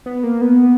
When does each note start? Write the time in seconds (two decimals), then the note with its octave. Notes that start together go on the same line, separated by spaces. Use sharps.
0.06 B3
0.24 A#3
0.41 B3